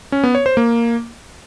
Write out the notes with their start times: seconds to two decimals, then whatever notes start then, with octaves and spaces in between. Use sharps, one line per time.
0.12 C#4
0.23 B3
0.35 C#5
0.46 C5
0.57 A#3